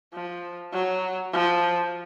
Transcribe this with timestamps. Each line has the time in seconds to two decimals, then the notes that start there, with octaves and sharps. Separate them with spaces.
0.14 F3
0.73 F#3
1.33 F3